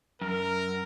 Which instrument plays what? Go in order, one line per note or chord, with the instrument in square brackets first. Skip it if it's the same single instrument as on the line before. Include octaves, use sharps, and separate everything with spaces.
[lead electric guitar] F#2 [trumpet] A#4